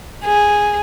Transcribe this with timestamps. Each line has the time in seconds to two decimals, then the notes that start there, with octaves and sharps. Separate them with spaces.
0.24 G#4